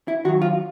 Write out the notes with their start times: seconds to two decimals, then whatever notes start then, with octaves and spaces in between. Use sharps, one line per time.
0.08 E4
0.25 D#3 F#4
0.29 F#3
0.42 F4